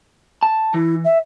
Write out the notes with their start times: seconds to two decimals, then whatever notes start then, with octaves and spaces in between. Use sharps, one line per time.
0.43 A5
0.74 E3 E4
1.04 E5